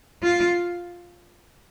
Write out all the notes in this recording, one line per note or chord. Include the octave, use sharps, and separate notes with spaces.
F4